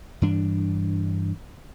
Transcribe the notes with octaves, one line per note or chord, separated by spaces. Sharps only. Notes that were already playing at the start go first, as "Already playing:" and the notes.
G2 E3 D4